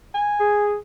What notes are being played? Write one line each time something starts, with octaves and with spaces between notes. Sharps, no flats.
G#5
G#4